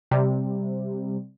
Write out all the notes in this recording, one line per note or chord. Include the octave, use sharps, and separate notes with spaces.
C3 G3